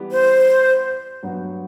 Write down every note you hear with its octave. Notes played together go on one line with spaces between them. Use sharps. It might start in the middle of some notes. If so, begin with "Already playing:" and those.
Already playing: E3 G3 B3 E4 G4
C5
G2 F#3 B3 F#4